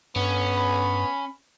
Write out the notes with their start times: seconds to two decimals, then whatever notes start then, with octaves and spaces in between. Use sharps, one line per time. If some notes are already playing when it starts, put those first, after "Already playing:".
0.16 G2 B3 C#4
0.57 B5